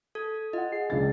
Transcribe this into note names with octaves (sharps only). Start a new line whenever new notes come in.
A4 G#6
F4 D#5 F#5
G#4 C7
C#2 D4 A6